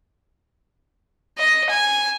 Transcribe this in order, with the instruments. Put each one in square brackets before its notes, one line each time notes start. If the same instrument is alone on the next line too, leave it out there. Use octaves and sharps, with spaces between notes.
[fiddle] D#5
G#5